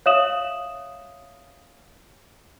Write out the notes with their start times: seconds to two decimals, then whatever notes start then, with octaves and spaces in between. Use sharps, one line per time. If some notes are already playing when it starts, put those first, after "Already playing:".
0.06 C#5 E5 F5 D#6 E7 F#7